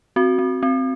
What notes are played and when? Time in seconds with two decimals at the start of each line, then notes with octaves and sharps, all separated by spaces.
0.16 C4 F#4
0.39 C4
0.63 C4